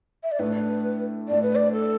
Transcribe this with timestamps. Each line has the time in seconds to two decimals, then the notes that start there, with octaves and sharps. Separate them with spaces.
0.23 E5
0.32 D5
0.39 A2 A3 D4 B4
1.28 A2 A3 D4 D5
1.42 B4
1.55 D5
1.73 A4